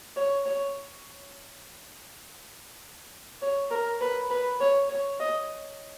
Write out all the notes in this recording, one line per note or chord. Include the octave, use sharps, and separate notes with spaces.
C#5
C#5
C#5
A#4
B4
B4
C#5
C#5
D#5